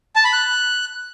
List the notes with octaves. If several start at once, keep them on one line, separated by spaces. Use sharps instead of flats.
A5
B5
F#6